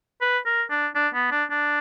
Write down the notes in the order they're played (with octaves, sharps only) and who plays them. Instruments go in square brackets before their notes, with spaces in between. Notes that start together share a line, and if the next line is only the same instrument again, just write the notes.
[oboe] B4
A#4
D4
D4
B3
D4
D4